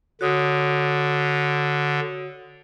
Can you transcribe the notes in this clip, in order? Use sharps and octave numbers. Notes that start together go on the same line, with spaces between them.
D3 F#4 C#5 D#6